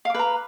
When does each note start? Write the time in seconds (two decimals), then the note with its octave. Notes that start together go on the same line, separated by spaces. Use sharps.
0.05 F5
0.10 D6
0.14 B4
0.19 A#5